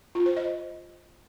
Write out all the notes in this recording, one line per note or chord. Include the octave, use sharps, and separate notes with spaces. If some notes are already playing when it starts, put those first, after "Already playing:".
F4
C5
D#5